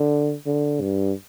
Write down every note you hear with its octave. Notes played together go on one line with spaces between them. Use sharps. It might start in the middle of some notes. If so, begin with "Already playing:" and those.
Already playing: D3
D3
G2